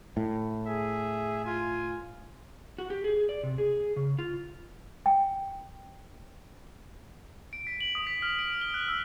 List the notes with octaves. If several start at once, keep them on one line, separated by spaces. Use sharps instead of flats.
A2
G#4 E5
F4 G#5
F#4
G4
G#4
D5
C3
G#4
C#3
F4
G5
D7
B6
F#7
D#6
B6
F6
D7
G7
F#6
E6